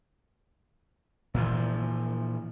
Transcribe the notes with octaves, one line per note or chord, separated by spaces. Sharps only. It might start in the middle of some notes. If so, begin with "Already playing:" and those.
A#2 E3 F3